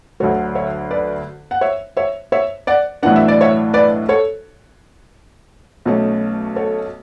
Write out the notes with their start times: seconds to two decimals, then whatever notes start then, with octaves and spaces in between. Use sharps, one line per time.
0.20 D2 D3 F#3 A4 C#5
0.55 C#5 E5
0.91 B4 D5
1.51 F#5
1.61 C#5 E5
1.97 C#5 E5
2.32 C#5 E5
2.67 D5 F#5
3.03 B1 A2 E3 B3 D4 F#5
3.16 E5
3.28 D5
3.41 C#5 E5
3.74 B4 D5
4.09 A4 C#5
5.85 B1 B2 A3 C#4
6.56 A4 C#5